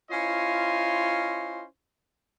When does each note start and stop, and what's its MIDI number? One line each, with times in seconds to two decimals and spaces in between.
0.11 1.64 61
0.11 1.64 64
0.11 1.64 65
0.11 1.64 72
0.11 1.64 73
0.11 1.64 75